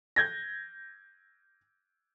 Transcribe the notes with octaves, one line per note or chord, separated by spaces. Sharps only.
G6 G#6 A#6